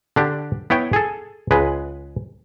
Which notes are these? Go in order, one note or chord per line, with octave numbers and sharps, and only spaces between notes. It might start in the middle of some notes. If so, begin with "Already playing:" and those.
D3 D4 G4
B3 E4 C#5 G5
G#4 A4
C#2 G#3 B4